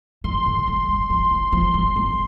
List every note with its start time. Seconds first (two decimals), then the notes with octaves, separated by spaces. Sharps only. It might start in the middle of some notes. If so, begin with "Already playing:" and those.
0.24 E3 C6
0.46 D3
0.68 G3
0.89 G3
1.10 F3
1.31 E3
1.52 F3
1.74 G3
1.96 B3